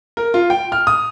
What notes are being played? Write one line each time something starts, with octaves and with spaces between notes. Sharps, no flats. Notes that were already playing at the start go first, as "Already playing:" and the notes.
A#4
F4
G5
F6
D#6